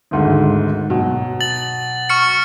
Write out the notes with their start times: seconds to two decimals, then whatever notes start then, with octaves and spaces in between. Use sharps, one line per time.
0.11 G#1 D2 G#2
0.90 B2 F#3
1.41 A6 F#7
2.09 C#6 F6 C#7